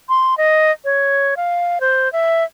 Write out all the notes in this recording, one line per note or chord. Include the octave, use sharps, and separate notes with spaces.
C6
D#5
C#5
F5
C5
E5